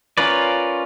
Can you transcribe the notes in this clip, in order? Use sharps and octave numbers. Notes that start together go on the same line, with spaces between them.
C#4 F4 A#4 B4 D5